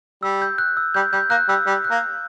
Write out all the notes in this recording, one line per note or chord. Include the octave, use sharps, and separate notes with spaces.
G3 E6
G6
F#6
E6
G3 G6
G3 G6
A#3 F#6
G3 E6
G3
F#6
A#3